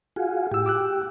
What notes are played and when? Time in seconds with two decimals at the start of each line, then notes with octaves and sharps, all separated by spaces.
0.16 F4 F#4 G#4
0.51 A2 G4 E6
0.66 D6 E6 F#6